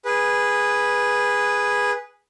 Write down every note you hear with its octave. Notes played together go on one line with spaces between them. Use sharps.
G#4 B4